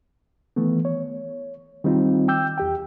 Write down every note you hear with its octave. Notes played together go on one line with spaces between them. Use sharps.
D#3 E3 A3 B3
C#5
D#3 G3 C4 D#4 F4
G5 D6 E6 G6
E2 G4 G5